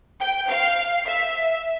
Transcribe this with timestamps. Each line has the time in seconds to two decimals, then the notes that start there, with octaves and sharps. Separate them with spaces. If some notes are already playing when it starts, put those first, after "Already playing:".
0.20 G5
0.49 F5
1.06 E5